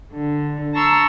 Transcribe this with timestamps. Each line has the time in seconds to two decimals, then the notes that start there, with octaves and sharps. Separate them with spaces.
0.12 D3
0.73 A5 A#5 C6 C#6 E6